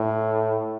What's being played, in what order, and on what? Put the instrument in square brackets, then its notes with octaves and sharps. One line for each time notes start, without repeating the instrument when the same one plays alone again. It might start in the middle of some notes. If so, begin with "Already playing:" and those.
Already playing: [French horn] A2